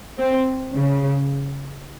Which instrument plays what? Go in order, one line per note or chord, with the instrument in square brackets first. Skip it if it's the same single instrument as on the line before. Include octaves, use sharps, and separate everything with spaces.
[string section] C4
C#3